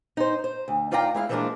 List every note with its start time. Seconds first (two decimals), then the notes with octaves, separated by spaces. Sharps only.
0.17 D#4 C5
0.44 C5
0.68 D2
0.91 D#4 F4 D5 F5 G5 A#5
1.15 G#3 E4 F5
1.29 E3 F3 G#3 A#3 D4 A#4